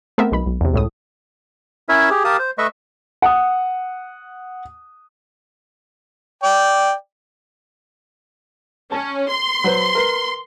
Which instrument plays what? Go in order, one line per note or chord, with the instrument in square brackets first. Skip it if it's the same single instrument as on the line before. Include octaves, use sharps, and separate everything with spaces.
[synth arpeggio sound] A3 B3 C4 G#4 A#4 E5
B1 G#3 B5
B1
E2 C3
C#2 A2 D#6
[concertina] C#4 E4 A#4 C#5 E5 G#5
G4 G#4
G4 A#4 F5 A5 D#6
C5
A3 B4 D#5 E5 C#6
[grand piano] F#5 D#6
[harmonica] D5 G5
[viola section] C#4 [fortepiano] A5
[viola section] C6
[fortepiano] F#3 B4 C5
A#4 B4